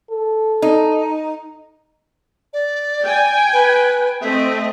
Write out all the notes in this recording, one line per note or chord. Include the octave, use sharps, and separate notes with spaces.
A4
D#4
D5
G5 G#5
B4
A3 C4 D#5 E5